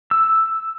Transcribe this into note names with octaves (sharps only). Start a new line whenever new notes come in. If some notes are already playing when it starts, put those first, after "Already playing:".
E6